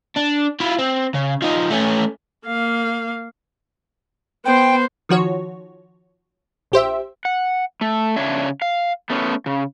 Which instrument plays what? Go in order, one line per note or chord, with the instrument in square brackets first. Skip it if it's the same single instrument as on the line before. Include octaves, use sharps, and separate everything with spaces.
[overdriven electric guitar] D4
E4 F4
C4
C#3
F3 D#4
A3 C#4
[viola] A#3 F5
[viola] B3 C5 [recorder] G5
[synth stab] D#3 F3 F#4 C#5
A#1 G4 C5 E5
[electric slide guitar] F#5
A3
C#3 D4 C#5 E5
F5
A3 B3 C#4
C#3